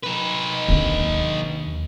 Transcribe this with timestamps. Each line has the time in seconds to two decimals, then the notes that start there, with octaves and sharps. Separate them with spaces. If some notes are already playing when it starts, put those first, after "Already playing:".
0.04 D#4 B4
0.69 D#2 D4